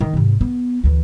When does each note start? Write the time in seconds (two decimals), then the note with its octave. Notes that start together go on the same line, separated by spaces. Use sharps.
0.01 D#3
0.14 G#2 C3
0.41 B3
0.83 D2 E3